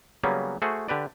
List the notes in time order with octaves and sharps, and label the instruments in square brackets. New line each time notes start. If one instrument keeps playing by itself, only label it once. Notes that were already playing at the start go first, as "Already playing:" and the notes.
[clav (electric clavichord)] C#3 F#3 G3 A#3 B3 C#4
A3 F#4 G#4 C5
D3 G4 B4 D5